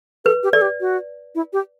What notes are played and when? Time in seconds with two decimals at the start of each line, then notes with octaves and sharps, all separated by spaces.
0.25 A4 B4
0.43 G4
0.53 A4 D5
0.62 G4
0.81 F#4
1.35 E4
1.53 G4